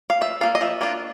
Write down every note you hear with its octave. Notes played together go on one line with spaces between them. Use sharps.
F5
F3 E5
A#3 D4 F4 F5
D#5
F3 E5
A#3 D4 F4